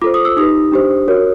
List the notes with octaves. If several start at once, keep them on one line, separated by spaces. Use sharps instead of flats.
F4 A4 C5 D6
D#6
E6
D#4 G4 B4 D#6
D4 G4 C5
F#4 A#4 C#5